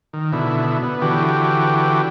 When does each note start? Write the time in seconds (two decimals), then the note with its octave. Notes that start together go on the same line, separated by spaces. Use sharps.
0.13 D#3
0.33 B2 D3 E4
0.83 B3
1.02 D3 E3 F#4 G4